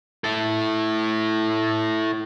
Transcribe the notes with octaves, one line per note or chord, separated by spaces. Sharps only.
E4 A4